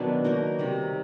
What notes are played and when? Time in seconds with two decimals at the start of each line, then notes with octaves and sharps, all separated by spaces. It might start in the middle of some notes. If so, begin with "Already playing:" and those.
Already playing: B2 D#3 F#3 B3 D4
0.24 A#3 D#4 F#4 A#4
0.59 C3 D#3 G3